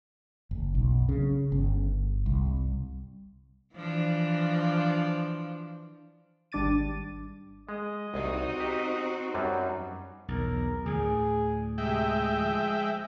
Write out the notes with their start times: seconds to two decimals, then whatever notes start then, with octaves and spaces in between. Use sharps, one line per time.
0.51 F#1
0.75 B1
1.09 C#3
1.52 G1
2.26 C2
3.74 E3 F3 D4
6.52 G#1 G3 D4 D6 A6 D#7
7.69 G#3 D#5
8.14 C2 C4 D#4 F#4
8.60 G4
9.34 F#2 F#3 G3
10.28 B1 E2 A#4
10.86 D2 A2 D3 G#4
11.78 C3 G#3 E5 G5
12.26 F3